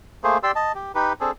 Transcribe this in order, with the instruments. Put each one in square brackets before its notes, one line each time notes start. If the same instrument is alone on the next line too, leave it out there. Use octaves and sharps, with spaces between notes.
[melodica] A3 A#3 G#4 C5
G4 D5 C6 E6
D#5 A5
G4
D#4 G4 B4
C4 D4 G#4 A4